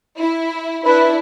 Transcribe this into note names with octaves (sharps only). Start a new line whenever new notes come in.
E4
D4 E4 B4